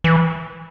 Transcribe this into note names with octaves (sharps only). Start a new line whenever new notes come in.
E3